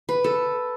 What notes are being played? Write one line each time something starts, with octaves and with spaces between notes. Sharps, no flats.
B4
A4